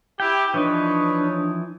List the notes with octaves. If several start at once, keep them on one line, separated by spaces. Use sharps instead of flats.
E4 G4 G5
E3 F3 D4 D#4 B4 C#5